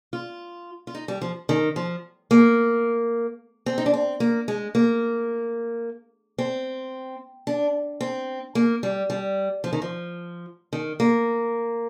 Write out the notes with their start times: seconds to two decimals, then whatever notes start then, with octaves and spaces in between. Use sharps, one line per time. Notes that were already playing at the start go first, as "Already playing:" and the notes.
0.13 F4
0.87 F4
0.95 D#4
1.08 G3
1.22 F3
1.49 D#3
1.76 F3
2.31 A#3
3.66 C4
3.78 D#4
3.86 D4
3.94 C4
4.20 A#3
4.48 G#3
4.75 A#3
6.38 C4
7.47 D4
8.01 C4
8.55 A#3
8.83 G3
9.10 G3
9.64 F3
9.73 D#3
9.82 F3
10.73 D#3
11.00 A#3